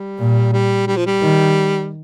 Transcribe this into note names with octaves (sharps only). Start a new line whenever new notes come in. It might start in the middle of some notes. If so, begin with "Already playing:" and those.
Already playing: G3
A#2
G3
G3
F3
G3
D#3